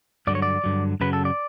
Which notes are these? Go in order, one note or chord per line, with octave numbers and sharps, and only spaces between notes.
G2 D3 F#3 D5
C#5
D5
G2 D3 F#3
F#2 C#3 F#3 B4
A4
D5